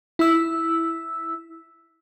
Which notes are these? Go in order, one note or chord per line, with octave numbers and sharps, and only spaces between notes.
E4 E6